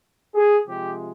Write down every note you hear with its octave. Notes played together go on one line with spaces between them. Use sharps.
G#4
C3 F3 G#3 G4